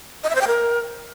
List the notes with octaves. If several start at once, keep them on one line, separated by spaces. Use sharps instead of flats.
D#5
E5
C5
G5
A#4